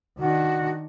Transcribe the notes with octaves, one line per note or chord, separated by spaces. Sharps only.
D#3 D4 F#4